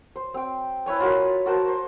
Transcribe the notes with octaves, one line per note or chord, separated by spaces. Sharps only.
C5
C4 G5
E4 B4 C#5 G#5
F4 F#4 A#4 B4
F#4 A#4 C5 A5
C5